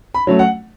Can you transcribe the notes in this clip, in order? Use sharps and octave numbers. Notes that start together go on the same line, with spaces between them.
B5
F#3 A3 C#4
F#5